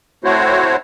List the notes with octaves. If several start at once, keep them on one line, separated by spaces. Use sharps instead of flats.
A3 C4 E4 F#4 C5 C#5